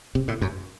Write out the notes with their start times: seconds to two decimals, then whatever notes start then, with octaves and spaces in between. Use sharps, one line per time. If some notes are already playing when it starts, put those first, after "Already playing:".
0.15 C3
0.28 A2
0.42 F#2